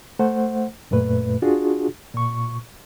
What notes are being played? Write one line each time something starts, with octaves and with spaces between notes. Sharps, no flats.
A3 C5 F#5
F#2 A#2 A3 B4
D4 F4 F#4 G#4
A#2 C#6